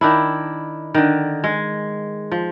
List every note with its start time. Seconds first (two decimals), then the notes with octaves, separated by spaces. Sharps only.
0.01 D#3 D4 E4
0.94 D3 D#3
1.44 G#3
2.31 F3